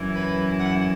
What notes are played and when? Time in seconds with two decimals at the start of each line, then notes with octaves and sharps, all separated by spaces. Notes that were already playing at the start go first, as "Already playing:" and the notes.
Already playing: F#2 E3
0.15 B4
0.59 F#5